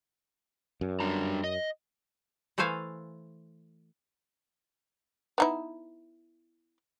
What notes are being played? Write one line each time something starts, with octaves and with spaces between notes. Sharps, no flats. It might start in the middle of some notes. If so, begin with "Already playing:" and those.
F#2
G3 D4 A#5
D#5
E3 A3 A4 C5 F5 G#5
B3 D#4 E4